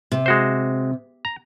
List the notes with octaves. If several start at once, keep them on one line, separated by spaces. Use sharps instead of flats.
C3
G#3 F#4 C5
A#5